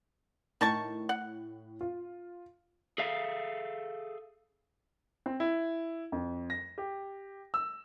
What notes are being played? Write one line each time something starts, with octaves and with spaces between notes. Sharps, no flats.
A2 D#3 A5 C#6
F#5
F4
G#4 A4 E5 F5
C4
E4
F2
A#6
G4
E6